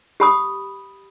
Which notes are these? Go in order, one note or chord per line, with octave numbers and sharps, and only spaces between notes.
G4 B5 D#6